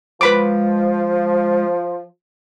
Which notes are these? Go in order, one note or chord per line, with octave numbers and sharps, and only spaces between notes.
F3 G#3 B4 B5 D6